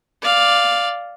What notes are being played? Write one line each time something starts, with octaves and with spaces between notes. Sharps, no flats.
D5 F5